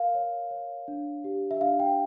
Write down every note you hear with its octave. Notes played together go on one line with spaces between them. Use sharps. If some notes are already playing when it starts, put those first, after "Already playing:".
Already playing: A#4 F5
C#5
C#5
D4
G4
E5
D4 F5
G5